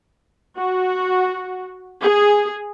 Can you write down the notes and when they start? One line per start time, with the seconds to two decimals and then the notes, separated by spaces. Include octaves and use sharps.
0.57 F#4
2.03 G#4